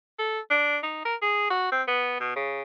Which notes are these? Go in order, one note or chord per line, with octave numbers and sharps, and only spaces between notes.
A4
D4
D#4
A#4
G#4
F#4
C4
B3
B2
C#3